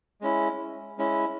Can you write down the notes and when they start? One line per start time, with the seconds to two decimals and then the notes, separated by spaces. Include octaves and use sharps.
0.21 G#3 C#4 E4
0.98 G#3 C#4 E4